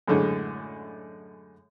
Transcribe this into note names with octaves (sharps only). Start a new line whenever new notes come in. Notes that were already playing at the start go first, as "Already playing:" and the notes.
F#2 A2 D3 G#3